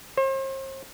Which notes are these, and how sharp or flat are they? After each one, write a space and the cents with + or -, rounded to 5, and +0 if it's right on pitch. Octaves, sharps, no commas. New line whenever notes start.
C5 +40